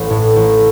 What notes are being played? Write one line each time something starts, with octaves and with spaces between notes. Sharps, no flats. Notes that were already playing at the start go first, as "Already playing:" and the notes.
Already playing: A1
A2
A1